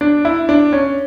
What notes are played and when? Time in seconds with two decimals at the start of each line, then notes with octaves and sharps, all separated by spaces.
0.01 D4
0.25 E4
0.49 D4
0.73 C#4